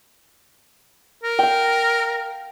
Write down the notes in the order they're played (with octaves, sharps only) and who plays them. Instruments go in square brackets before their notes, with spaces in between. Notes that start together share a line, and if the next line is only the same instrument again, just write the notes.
[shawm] A#4
[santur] F5 G5